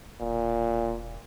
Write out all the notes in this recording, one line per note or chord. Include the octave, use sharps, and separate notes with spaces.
E1 A#2